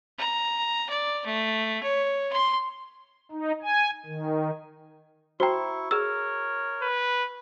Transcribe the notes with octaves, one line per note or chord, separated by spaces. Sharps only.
A#5
D5
A3
C#5
C6
D#4
G#5
D#3
E4 F#4 C5 G5 A#5 C#6
G#4 A#4 C#5 E6
B4